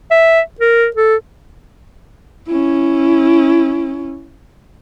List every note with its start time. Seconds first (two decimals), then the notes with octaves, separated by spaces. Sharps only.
0.11 E5
0.60 A#4
0.96 A4
2.48 C#4 E4